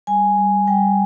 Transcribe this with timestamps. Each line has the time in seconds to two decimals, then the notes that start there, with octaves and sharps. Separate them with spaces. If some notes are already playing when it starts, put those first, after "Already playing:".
0.07 G3 G#5
0.38 G3
0.67 G3 G5